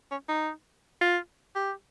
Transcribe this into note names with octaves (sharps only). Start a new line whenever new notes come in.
C#4
D#4
F4
G4